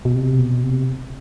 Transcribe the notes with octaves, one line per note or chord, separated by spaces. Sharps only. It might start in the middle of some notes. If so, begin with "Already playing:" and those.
B2
C3
B2
C3